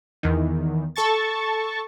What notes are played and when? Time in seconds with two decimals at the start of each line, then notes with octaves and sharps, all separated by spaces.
0.23 E2 D#3
0.96 A4 A5 C#6 A6